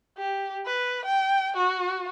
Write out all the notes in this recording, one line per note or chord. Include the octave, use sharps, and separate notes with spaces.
G4
B4
G5
F#4